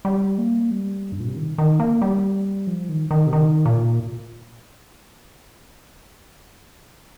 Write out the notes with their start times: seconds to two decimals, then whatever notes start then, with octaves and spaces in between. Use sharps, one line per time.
0.05 G3
0.38 A#3
0.71 G3
1.12 G2
1.20 A#2
1.28 C3
1.36 D#3
1.58 D#3
1.80 A#3
2.02 G3
2.67 F3
2.89 D#3
3.11 D#3
3.27 C3
3.33 D#3
3.66 A#2